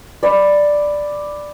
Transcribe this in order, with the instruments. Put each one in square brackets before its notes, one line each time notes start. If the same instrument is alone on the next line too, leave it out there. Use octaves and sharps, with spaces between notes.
[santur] D5 B5